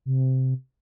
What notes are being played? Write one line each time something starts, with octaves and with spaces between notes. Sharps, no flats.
C3